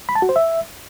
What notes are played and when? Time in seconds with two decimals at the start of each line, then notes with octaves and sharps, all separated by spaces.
0.09 B5
0.15 A5
0.22 F#4
0.29 C5
0.36 E5